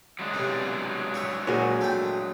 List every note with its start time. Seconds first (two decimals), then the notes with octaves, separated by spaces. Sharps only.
0.19 F#3 G#3 D4
0.34 B1 C3
1.14 C#5 E5
1.47 A#2 F#4 G#4 C#5
1.81 A3 G5